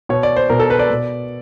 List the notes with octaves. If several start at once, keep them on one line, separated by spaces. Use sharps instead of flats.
B2 C#5
D5
C5
B2 A#4
A4
B4
D5
B2